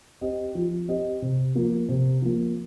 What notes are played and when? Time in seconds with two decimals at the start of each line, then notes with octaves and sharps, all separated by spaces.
0.21 C4 G4 D#5
0.55 F3
0.88 C4 G4 D#5
1.22 C3
1.55 F3 A#3
1.89 C3
2.22 F3 A#3